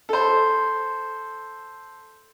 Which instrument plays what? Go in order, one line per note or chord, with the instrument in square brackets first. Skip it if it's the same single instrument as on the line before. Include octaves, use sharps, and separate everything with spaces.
[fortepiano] A4 C5